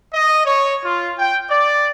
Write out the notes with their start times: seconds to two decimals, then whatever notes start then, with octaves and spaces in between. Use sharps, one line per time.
0.14 D#5
0.46 C#5
0.85 F4
1.19 G5
1.50 D5